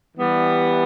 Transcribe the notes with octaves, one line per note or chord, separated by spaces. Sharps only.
E3 G3 B3